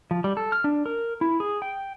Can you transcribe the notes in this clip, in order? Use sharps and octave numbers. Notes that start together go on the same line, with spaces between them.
F3
G3
A4
F6
D4
A#4
E4
G#4
G5